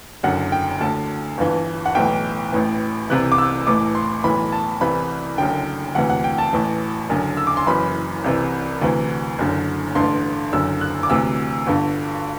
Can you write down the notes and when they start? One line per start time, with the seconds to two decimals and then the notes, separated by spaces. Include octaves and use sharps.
0.23 F#1 F#2 D3 F#5
0.52 G5
0.81 D2 D3 A5
1.38 G1 G2 E3
1.86 F#5
1.95 B1 A2 E3 G5
2.52 A1 A2 E3
3.10 C2 C3 E3 F#6
3.32 D6
3.38 E6
3.67 A1 A2 E3 D6
3.95 C6
4.24 B1 A2 E3 B5
4.52 A5
4.81 C2 C3 E3 B5
5.38 F#1 F#2 D3 G5
5.95 D2 C3 E3 F#5
6.10 F#5
6.24 G5
6.38 A5
6.53 A1 A2 E3
7.09 F#1 F#2 D3
7.37 E6
7.47 D6
7.57 C6
7.67 F#1 F#2 E3 B5
8.24 C2 C3 E3
8.81 D2 C3 E3
9.39 F#1 F#2 D3
9.95 A1 G2 D3 C6
10.52 F#1 F#2 D3 E6
10.81 F#6
11.03 D6
11.10 D2 C3 E3 E6
11.67 G1 G2 D3